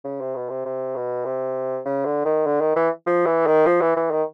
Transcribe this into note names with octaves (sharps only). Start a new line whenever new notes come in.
C#3
C3
B2
C3
C3
B2
C3
C#3
D3
D#3
D3
D#3
E3
F3
E3
D#3
F3
E3
E3
D#3